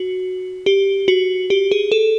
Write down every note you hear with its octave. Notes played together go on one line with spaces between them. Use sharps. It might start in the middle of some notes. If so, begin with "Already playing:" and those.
Already playing: F#4
G4
F#4
G4
G#4
A4